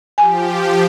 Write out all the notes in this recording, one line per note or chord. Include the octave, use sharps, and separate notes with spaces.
F3 G4 G#5